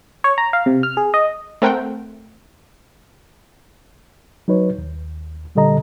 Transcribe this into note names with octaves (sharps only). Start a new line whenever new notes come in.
C#5
A#5
F5
C3
F6
G#4
D#5
A3 C4 A#4 F#5 G5
F#3 D#4 B4 C#5
D#2
A#2 D3 G3 A4 D#5 A#5